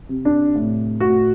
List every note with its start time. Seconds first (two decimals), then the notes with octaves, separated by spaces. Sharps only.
0.09 C3
0.25 D4
0.55 A2
1.00 A2 F#4